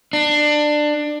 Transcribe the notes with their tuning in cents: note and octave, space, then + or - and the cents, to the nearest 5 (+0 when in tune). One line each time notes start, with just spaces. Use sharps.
D4 +20